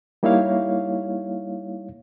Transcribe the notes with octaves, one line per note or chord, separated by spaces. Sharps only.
G3 A#3 D#4 E4 C#5 F5